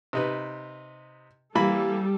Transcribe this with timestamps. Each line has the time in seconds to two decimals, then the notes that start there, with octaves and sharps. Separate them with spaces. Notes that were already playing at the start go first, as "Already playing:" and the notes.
0.13 C3 D#4 B4
1.55 E3 G3 A#3 A4 B5